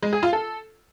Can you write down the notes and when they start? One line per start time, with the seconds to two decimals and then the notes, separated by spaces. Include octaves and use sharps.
0.03 G#3
0.13 G#4
0.23 F4
0.33 A4